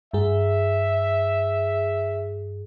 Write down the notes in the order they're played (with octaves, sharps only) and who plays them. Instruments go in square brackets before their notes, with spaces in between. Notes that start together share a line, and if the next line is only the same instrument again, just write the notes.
[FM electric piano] G2 G#4 [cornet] E5